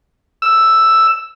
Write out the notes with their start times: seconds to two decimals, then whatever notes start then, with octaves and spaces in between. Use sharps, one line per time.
0.42 E6